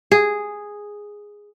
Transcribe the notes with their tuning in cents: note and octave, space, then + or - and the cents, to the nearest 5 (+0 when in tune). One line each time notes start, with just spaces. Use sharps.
G#4 -5